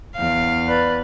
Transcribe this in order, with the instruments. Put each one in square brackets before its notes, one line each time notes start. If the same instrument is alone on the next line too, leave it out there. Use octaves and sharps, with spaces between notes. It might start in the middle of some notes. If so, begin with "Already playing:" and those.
[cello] E2 [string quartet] F5
[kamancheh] B4 [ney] D5